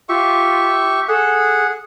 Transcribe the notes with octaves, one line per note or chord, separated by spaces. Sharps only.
F4 G4 E5 C#6
G#4 A4 F#5